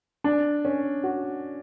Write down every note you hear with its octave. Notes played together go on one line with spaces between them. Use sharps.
D4
C#4
F#4